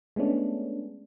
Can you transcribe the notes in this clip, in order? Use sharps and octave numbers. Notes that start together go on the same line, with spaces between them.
G#3 A3 B3 C#4 D4